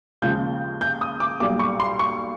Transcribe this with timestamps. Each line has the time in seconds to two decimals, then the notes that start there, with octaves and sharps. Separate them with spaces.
0.22 D#2 C#3 F3 G#3 G6
0.81 G6
1.01 D#6
1.20 D6
1.40 B1 A#2 G3 D6
1.59 C#6
1.80 C6
1.99 C#6